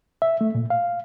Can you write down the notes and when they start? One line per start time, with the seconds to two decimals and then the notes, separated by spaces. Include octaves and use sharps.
0.22 E5
0.41 A3
0.55 A#2
0.70 F5